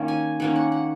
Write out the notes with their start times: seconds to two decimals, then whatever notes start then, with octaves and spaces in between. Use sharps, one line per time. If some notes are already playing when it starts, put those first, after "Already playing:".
Already playing: D#3 A#3 C#4
0.08 G#5
0.40 D#3 A#3 C#4 F#5
0.56 F#5
0.72 F#5